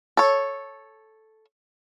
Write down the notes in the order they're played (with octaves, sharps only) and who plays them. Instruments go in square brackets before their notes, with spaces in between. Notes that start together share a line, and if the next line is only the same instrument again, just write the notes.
[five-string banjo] A4 C#5